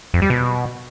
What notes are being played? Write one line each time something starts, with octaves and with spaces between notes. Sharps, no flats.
F2
G3
B2